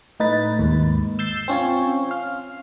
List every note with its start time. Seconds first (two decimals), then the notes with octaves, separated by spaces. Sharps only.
0.20 A2 D#4 B4 A6
0.59 D#2 G#2
1.19 E6 G6 A6 C7
1.48 C4 C#4 F4 C#5
2.11 F5